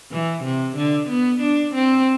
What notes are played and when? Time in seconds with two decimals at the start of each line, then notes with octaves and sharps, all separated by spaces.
0.12 E3
0.44 C3
0.77 D3
1.10 B3
1.41 D4
1.75 C4